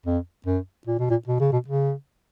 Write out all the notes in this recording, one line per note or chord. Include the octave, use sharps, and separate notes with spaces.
F2
F#2
A#2
B2
A#2
B2
C#3
B2
C#3